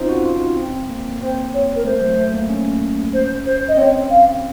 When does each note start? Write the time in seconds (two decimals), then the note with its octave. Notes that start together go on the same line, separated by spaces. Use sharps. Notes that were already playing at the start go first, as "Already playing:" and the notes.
Already playing: C4 C#4 D#4 F4 C5
0.09 F#4
0.25 F4
0.57 C4
0.89 A#3
1.21 C4 C5
1.54 C#5
1.75 A#4
1.85 A3 C5
1.97 A3
2.01 F#3
2.17 A3
2.34 A#3
2.49 C#4
3.13 C5
3.46 C5
3.68 D#5
3.77 C4 C#5
4.10 F5